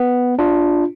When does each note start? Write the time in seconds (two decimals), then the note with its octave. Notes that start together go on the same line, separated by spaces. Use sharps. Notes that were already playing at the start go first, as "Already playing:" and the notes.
Already playing: B3
0.39 D4 F4